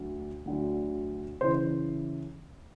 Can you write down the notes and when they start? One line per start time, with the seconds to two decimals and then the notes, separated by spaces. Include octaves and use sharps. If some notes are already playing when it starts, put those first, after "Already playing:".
Already playing: D2 D3 F#3
0.45 D2 D3 F#3
1.41 C#3 E3 C5